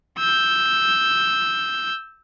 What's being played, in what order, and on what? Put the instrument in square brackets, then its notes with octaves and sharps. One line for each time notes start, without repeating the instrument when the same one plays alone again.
[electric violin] E6 G6